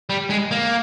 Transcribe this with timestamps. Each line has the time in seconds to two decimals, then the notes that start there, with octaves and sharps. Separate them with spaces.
0.10 G3
0.30 G#3
0.51 A#3